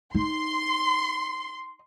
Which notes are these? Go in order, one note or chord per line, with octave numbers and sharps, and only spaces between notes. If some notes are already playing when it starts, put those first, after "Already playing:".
D#4 C6